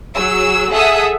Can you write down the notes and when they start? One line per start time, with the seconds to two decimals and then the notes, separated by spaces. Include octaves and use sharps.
0.15 F#3 G#4 E6
0.71 G#4 A4 E5 F#5 D#6